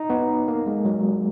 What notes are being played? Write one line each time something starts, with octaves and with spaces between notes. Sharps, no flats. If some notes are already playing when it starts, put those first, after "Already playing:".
Already playing: D#4
B3
A#3
G#3
F#3